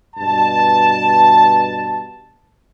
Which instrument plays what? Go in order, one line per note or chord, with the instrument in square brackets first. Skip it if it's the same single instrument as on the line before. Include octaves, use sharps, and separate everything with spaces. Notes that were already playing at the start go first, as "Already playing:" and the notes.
[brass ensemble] G2 B2 A5